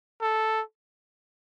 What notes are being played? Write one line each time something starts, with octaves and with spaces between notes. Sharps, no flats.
A4